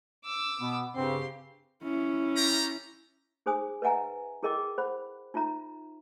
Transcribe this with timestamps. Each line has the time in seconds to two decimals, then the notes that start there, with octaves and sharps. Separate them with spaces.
0.25 D6 E6
0.61 B2 B3
0.96 G2 C#3 C4 G4 C6
1.83 C#4 E4
2.36 F4 G4 A#5
3.46 D#4 G#4 C5 G#5 D#6
3.82 B4 D#5 E5 F#5 G#5 A#5
4.43 E4 G#4 A#4 D#5 G5 D6
4.78 C5 F#5 B5
5.34 D#4 F4 E5 A#5